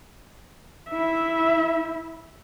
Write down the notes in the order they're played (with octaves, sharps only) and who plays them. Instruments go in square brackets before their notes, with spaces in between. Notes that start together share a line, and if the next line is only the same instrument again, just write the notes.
[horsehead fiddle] E4 E5